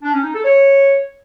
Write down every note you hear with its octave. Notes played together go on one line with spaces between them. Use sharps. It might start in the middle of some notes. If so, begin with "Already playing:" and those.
D4
C#4
D#4
A4
C#5